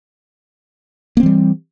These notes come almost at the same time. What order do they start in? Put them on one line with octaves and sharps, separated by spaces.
A#3 C4 E3 G3